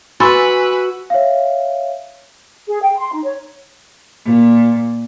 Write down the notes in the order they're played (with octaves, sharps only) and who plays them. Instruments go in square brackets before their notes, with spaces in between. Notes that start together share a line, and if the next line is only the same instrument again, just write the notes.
[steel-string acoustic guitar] F#4 [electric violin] B4 [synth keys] G#5 E6 [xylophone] B5 C6 A6
[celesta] C#5 E5 F5
[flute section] G#4
G5
C6
D#4
C#5
[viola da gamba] A#2